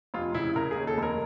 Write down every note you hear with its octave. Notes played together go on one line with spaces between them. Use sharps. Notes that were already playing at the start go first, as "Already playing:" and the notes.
F1 F4
C#3 E4
C#3 A#4
D#2 G#4
A4
F1 A#4